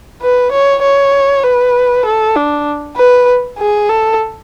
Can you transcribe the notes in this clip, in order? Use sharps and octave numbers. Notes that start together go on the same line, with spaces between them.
B4
C#5
C#5
B4
A4
D4
B4
G#4
A4